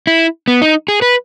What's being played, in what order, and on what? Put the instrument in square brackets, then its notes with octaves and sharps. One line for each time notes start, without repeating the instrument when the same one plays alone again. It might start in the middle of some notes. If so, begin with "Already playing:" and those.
[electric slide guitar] E4
B3
D#4
G#4
B4